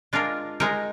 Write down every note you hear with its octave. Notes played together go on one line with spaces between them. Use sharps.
G#3 D4 F4 A#4
G#3 D#4 A#4